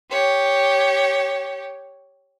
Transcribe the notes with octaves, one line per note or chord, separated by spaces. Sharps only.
G4 C#5